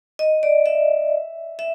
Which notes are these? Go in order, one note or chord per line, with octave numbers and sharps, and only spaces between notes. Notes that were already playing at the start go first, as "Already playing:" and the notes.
D#5
D5
E5
E5